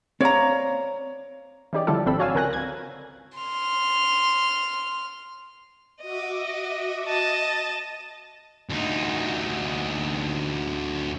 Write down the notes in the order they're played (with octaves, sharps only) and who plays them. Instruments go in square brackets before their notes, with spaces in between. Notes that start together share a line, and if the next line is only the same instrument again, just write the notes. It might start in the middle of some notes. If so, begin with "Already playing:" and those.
[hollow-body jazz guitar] C4 D5 F5 [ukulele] C#5 A#5
[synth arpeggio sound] E3 C#4 D#4 G4 D5
D3 F3 G3 E4 F4 A4
G#1 F3 C4 D4 A4 B5
F#4 C#5 D5 F5 G#5 E6
C#2 C4 A#4 G#5 F#6 A#6
G#6
[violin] C6 F6
[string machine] F#4 E5 D6 [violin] D#5
[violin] D#5 A5
[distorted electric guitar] D2 D#4